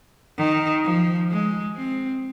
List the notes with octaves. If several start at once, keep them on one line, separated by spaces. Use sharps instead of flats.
D#3
F3
G#3
C4